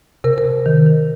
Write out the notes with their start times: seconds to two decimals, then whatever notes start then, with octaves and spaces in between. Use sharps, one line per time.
0.24 C3 A#4
0.38 A#4
0.45 C3
0.66 D#3
0.87 D#3